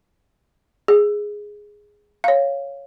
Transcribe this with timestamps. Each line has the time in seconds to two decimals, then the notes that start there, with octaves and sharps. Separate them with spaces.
0.88 G#4
2.24 C#5 F5